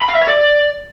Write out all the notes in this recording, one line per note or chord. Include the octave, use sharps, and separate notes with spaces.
B5
F5
E5
C#5
D5